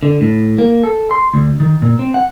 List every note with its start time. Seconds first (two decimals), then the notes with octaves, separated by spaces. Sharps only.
0.03 D3
0.21 A2
0.58 A#3
0.84 A4
1.11 C6
1.34 D2
1.60 D#3
1.82 A#2
1.99 C4
2.14 F#5